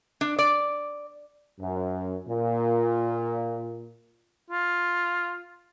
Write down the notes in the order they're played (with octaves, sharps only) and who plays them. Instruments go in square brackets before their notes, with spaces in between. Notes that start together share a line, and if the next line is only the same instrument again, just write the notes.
[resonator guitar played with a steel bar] D4
D5
[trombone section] F#2
A#2
[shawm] F4